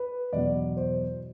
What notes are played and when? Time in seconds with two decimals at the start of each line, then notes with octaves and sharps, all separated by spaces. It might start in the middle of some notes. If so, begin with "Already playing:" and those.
Already playing: B4
0.33 E2 B2 F#3 D5
0.77 C5